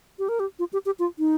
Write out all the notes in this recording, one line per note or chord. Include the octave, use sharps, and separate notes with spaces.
G4
A#4
G4
F4
G4
G4
F4
D#4